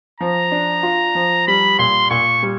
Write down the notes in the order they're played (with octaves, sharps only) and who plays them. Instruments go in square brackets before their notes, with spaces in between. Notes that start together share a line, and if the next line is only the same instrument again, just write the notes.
[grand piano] F3 [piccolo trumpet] A#5
[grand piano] D4
F4
F3
[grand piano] G3 [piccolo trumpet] B5
[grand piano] A#2 [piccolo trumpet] C6
[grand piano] A#2 [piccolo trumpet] C#6
[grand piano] G3